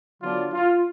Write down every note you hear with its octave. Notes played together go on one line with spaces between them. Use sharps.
D3 F#3 B3 D4 F4
F4